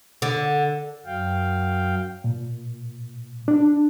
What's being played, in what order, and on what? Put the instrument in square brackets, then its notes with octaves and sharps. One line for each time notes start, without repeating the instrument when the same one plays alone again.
[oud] D3
[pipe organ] F#2 F#3 F5 G5
[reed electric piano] A#2
D4